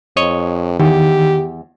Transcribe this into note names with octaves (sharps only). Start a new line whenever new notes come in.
F2 C#5 D#5
E2 D#3 G4